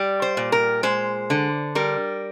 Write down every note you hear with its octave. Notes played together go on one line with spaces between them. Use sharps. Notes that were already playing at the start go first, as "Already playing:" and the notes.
Already playing: G3
C5
A#2
A#4
G#3 C5
D3
G3 A#4